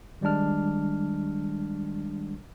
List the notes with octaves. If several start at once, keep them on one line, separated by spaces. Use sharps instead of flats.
D#3 G3 G#3 D4 F6